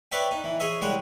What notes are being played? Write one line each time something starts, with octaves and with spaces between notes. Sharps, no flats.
B4 C#5 D5 E5 G5
D#4
E3
G#4 C#5 D#5 E5
C2 G3 G#3 C#5 F#5